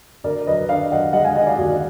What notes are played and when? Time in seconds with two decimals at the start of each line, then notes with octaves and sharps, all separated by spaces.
0.24 D2 A#4 D5
0.47 F#3 B4 D#5
0.69 D3 D5 F5
0.91 F#3 D#5 F#5
1.13 G#3 D#5 F#5
1.24 F5 G#5
1.35 D#3 D#5 F#5
1.47 D5 F5
1.57 D#2 F#4